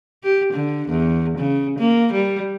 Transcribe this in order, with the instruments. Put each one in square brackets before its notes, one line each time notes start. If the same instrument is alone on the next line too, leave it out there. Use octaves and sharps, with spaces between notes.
[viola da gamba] G4
D3
E2
C#3
A#3
G3